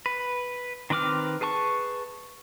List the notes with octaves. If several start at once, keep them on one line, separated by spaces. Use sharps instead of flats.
B4
D#3 C4 B4 D6 F6
G#4 B4 A5 C#6